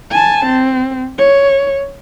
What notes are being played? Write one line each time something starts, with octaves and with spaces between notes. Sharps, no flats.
G#5 A5
C4
C#5